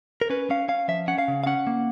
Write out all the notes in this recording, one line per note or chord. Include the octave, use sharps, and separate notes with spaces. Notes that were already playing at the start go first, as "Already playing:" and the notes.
A#4
C#4 B4
C#4 F5
C#4 F5
F3 E5
C#4 F#5
F5
C#3
F5
C#4 F#5
A#3